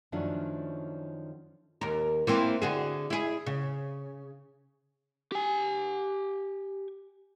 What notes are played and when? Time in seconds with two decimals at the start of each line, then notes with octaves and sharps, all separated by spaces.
0.12 F#2 D#3 F3 A3 C#4 D4
1.81 D#2 A#4
2.27 E3 A#3 C4
2.62 D3 F#4 G#4
3.10 E4 G#4
3.46 C#3
5.32 G4 G#5